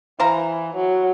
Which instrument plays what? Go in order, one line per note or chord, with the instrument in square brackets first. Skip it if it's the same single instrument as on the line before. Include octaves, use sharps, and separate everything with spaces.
[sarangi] E3 [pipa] C5 F5 A#5
[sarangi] F#3